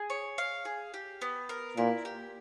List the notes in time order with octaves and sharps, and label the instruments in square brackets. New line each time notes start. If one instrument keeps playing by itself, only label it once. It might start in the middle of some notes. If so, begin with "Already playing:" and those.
Already playing: [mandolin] G#4
C#5
F5
G#4
G4
B3
A#4
[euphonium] A#2 [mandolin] E4
[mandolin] G4